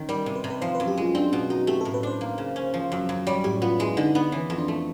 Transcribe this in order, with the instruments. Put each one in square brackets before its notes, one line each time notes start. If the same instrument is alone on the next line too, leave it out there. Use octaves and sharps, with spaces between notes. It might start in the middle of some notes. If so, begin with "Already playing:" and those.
Already playing: [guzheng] D#3 C#4
[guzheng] G3 [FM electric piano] A#4
[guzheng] C3
[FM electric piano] B4
[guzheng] C3
[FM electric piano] B4
[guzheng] F3 [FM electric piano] C5
[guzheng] F#2 [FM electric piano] B4
[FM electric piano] G4
[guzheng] G#3 [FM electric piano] F4
[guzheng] C4 [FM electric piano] D4
[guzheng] B2 [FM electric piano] F4
[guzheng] D#4 [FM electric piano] F#4
[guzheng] A3 [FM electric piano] G4
[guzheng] A2 [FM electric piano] A4
[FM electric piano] B4
[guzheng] D4 [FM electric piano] C5
[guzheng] A#3
C#3
C#4
F3
F#2
F#2
[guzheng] G3 [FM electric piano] C#5
[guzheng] A2 [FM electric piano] G4
[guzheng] B3 [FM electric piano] F4
[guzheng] G#3 [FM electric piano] E4
[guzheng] D3 [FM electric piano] D#4
[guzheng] B3 [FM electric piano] D4
[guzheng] E3 [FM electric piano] C#4
[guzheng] F2
[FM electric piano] D4
[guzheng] A3